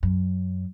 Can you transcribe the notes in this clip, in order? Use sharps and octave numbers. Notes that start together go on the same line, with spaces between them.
F#2